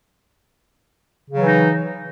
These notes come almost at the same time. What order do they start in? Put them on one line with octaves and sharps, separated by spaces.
C#3 F#3 E3 D#4